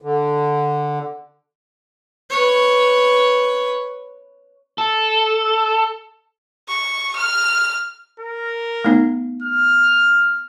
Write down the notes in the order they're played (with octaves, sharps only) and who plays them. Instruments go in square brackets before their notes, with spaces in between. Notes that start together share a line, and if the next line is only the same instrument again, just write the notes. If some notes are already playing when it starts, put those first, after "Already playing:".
[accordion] D3
[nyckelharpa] B4 C#5
[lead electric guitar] A4
[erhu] C#6
F6
[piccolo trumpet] A#4
[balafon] A3 B3 D#4
[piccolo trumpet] F6